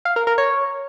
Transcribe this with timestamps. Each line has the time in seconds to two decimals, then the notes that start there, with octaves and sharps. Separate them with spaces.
0.05 F5
0.16 A#4
0.27 A#4
0.38 C#5